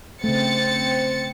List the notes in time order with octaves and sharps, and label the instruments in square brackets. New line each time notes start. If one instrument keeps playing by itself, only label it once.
[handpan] C#3 A3 [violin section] C4 A6 C#7